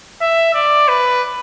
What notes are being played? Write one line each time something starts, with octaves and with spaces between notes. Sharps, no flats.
E5
D5
B4